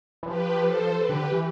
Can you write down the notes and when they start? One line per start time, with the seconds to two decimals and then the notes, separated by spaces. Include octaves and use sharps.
0.23 E3
0.27 F3 G4 B4
0.62 A4 C5
0.97 G4 B4
1.09 D3
1.32 E3